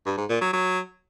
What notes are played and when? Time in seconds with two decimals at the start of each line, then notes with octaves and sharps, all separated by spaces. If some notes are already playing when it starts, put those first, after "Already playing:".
0.06 G2
0.18 G#2
0.29 A#2
0.41 F#3
0.53 F#3